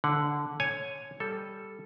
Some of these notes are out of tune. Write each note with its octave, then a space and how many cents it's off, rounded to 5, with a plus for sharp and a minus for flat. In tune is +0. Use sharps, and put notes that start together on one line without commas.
D3 -5 F#5 +0
C#5 +0 G#5 +0
G3 +0 A4 +0